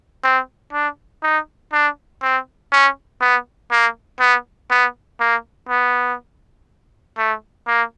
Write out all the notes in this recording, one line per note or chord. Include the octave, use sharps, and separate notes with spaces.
C4
D4
D#4
D4
C4
C#4
B3
A#3
B3
B3
A#3
B3
A3
A#3